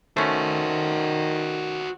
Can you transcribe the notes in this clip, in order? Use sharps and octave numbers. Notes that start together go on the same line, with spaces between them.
D#3 A3 C#4 F#4 C5